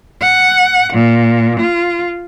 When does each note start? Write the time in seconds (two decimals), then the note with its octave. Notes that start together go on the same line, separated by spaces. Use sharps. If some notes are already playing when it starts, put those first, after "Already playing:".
0.21 F#5
0.92 A#2
1.60 F4